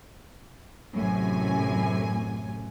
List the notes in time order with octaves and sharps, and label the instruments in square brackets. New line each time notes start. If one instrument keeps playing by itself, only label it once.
[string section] A1 F#2 A2 C3 G#5